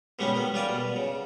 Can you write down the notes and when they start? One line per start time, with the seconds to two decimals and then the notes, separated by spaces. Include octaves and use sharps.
0.19 B2 D3 G3 G#3 B3 C#4
0.34 D#3 B3
0.54 G3 F4 D5 G#5
0.69 B2
0.96 C#3